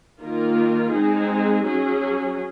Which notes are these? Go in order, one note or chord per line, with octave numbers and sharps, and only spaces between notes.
D#3 A#3 F4 A#4
G#3 C4 D#4 G#4
F#3 C#4 G#4